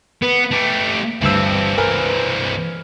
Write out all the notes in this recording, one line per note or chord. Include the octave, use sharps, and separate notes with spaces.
B3 B4
A3 G4
G1 G2 E3 C4 E6
A#4 B4 G#5